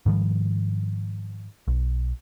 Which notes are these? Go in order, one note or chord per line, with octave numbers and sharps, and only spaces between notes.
G#2 D#3 F3 G3
B1